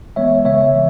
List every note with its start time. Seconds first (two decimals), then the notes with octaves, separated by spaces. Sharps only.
0.16 E3 G#3 B3 C#5 E5
0.45 C#3 C#5 E5
0.75 E3